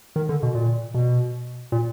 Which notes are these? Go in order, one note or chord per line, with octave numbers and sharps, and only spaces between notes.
D#3
D3
B2
A#2
B2
A#2